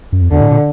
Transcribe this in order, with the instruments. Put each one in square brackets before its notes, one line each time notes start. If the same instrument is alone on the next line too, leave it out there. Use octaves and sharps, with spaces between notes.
[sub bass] F#2
F2
[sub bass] E2 [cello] D3
[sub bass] A2
A#2